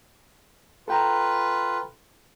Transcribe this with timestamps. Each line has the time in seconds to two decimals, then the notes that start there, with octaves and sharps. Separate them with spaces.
0.88 F4 A4 B4 G5 A#5